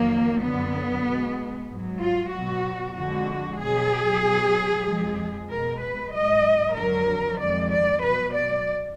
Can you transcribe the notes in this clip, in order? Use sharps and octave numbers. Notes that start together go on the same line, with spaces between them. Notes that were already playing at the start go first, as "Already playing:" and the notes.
Already playing: F2 D#3 F#3 A#3
F#2 D3 F#3 B3
B2 G#3
G#2 F#3
F4
B2 F#3 F#4
F2 D3 G#3 F#4
B2 F#3 G#4
B2 F#3
F2 F3 G#3
B2 G#3 A#4
B4
G#2 F#3 D#5
F2 D3 F#3 A#4
F2 D#3 G#3 D5
D5
B2 F#3 B4
D5